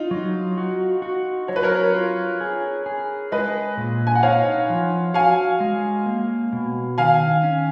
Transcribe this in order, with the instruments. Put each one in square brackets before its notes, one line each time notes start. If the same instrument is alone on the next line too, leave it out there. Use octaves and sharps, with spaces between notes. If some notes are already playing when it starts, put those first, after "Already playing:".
Already playing: [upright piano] D#4 F4
[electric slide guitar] F#3
F#4
F#4
[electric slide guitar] F#3 [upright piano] C#5
[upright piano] B4
A#4 C#5
[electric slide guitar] F4
G#4
G#4
[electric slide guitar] G#3 [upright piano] B4 D#5
[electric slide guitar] A#2
[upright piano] G#5
F#5
[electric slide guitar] D#4 [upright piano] C#5 F5
[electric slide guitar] F3
[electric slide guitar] F#4 [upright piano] F5 G#5
[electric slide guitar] G#3
A#3
B2
[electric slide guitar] D#3 [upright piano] F5 G#5
[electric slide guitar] C#4